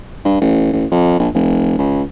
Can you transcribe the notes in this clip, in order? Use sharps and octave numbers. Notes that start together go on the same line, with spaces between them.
G2
A1
A1
F2
A#1
F1
C#2